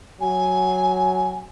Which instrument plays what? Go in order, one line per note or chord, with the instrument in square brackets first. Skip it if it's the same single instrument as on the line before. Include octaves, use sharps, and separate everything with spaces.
[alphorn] F#3 [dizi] G#5